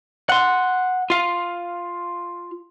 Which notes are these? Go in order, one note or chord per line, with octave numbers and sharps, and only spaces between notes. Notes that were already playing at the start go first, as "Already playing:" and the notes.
F#5 C6
F4 F5